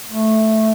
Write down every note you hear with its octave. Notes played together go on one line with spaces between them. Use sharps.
A3